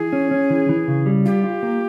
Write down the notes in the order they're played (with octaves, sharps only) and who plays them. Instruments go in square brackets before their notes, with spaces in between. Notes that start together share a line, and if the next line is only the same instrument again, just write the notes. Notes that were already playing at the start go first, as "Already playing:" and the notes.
Already playing: [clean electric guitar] E3 [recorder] G#4
[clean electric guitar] C#4
C#4
E3
E3
C#3
G3
[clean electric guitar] F4 [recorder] G4
[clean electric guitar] F4
A#3